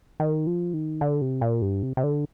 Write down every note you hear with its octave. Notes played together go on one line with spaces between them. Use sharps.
D#3
F3
D#3
D3
C3
A#2
G2
C3
C3
D3